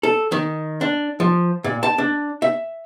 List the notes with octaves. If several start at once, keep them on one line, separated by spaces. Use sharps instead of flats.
A4
D#3
D4
F3
A#2
A5
D4
E5